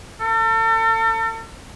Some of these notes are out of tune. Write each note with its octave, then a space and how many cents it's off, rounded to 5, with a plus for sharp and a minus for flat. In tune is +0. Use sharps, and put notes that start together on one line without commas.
A4 +40